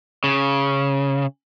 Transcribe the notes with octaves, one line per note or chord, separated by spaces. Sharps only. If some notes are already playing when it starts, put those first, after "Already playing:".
C#3